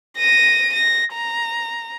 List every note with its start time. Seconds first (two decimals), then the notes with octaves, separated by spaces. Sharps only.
0.18 A#6 D#7
0.73 A#6
1.14 A#5